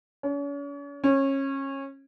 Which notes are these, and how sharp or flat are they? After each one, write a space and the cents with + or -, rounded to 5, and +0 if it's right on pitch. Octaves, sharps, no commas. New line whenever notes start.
C#4 +40
C#4 -25